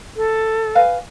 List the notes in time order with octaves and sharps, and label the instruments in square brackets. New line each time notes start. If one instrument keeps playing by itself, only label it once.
[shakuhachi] A4
[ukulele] B4 F5 G#5